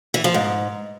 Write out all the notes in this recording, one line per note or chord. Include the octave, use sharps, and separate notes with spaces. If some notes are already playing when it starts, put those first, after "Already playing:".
E3
F3
G#2